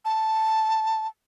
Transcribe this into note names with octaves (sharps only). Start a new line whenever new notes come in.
A5